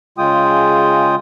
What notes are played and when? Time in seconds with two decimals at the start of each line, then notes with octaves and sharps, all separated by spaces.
0.18 C#3 G#3 F4 G5 D#6